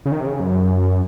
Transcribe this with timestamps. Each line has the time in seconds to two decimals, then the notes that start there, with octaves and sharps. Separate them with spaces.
0.06 C#3
0.12 D#3
0.20 C3
0.26 C#3
0.40 F#2